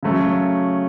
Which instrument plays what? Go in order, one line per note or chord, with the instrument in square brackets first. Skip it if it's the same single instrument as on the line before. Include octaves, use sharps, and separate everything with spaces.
[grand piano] C#3 F#3 A3 C#4